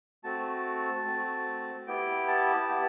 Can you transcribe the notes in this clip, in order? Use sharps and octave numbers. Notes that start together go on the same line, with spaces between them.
A3 C4 F#4 A5
A3 C4 F#4
B3 E4 G4 G5
A5
B3 E4 G4